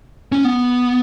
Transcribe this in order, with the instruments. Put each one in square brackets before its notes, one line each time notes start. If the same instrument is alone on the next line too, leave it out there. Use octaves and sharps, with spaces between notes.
[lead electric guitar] C#4
B3